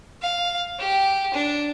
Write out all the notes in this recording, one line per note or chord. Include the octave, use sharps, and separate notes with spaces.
F5
G4
D4